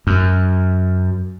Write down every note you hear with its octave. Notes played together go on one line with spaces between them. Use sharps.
F#2